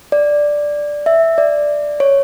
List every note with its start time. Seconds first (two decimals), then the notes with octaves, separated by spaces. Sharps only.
0.12 D5
1.06 E5
1.38 D5
2.00 C#5